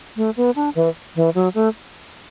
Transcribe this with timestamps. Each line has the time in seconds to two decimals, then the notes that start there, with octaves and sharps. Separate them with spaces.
0.17 A3
0.37 B3
0.56 D4
0.75 E3
1.16 E3
1.35 F#3
1.55 A3